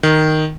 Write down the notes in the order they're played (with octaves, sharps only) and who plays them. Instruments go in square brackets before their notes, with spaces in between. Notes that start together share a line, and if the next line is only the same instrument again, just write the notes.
[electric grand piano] D#3